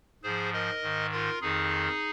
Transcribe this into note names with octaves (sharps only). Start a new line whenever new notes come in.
G#2 F3 G#4 C5
A#4 D#5
G#2 D#3
F4 A#4
F2 D#3 D#4 G#4